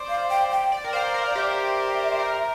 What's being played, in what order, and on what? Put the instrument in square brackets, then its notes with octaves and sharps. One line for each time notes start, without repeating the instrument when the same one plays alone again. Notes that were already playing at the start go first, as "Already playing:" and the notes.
Already playing: [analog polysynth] C5 D5
[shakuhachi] F5
G5
G5
[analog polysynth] D5
A#4
[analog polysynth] C5 [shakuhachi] F5
[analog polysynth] A#4
[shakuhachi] D5
[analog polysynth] G4 [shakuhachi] E5
[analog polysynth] C5
A#4